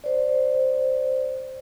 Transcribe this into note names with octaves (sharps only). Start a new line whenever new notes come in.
C5 D5